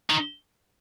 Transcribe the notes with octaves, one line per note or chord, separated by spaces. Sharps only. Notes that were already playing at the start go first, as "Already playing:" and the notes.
D#3